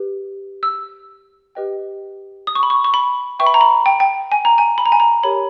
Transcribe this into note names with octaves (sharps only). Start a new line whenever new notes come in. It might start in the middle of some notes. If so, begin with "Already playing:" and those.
Already playing: G4 B4
E6
G4 B4 D#5 G5
D#6
C#6
B5
C#6
C#6
B5
B4 E5 G5 C#6
B5
A#5
B5
G5
G5
G#5
A#5
G#5
B5
A#5
G#5
A#5
G4 A#4 C#5 B5